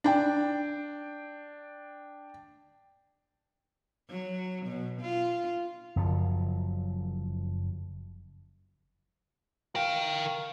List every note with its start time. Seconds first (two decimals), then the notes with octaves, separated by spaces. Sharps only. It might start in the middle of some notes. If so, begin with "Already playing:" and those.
0.04 D4 G5
4.10 F#3
4.66 B2
5.01 F4
5.96 F#1 F#2 F3
9.75 A#4 F5 G5
10.00 F5